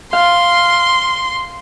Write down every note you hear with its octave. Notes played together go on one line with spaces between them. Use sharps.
F5 C6